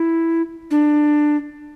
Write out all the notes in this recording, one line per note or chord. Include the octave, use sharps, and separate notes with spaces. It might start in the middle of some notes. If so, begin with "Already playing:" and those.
Already playing: E4
D4